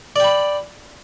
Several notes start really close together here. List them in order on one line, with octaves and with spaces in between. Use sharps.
D5 G5 B5